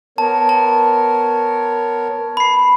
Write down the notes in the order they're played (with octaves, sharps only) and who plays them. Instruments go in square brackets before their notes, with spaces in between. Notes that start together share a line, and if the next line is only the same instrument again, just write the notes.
[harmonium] B3 A#4 C#5 [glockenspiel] A5
[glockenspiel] A5
B5 C7